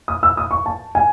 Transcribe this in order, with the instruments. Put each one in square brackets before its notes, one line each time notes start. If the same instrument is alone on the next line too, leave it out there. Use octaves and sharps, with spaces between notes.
[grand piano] D#6
E6
D#6
C#6
A5
G#5